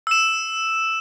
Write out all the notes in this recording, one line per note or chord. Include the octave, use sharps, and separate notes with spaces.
E6 E7